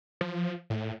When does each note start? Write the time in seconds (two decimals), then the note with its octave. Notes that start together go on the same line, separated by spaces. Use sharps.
0.21 F3
0.70 A2